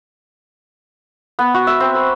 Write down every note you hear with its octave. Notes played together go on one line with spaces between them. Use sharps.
B3
F#4
E5
C4
B5